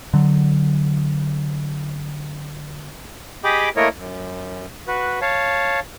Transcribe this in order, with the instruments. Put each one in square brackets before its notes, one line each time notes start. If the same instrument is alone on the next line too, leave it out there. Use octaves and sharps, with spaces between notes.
[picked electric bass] D3 F#3
[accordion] G4 G#4 D#5 G5 B5 D6
A3 A#3 E4 A#4 C#5 D#5
F#2
F#4 B4
C#5 F5 A5